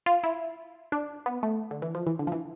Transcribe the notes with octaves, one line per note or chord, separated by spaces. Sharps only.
F4
E4
D4
B3
A3
D3
E3
F3
E3
D3
F3
E3